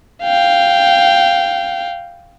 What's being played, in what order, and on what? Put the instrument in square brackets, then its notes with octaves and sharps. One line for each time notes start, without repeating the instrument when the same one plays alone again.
[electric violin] F5 G5